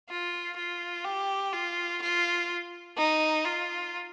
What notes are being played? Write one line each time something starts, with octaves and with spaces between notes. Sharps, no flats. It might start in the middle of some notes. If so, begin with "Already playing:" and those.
F4
F4
G4
F4
F4
D#4
F4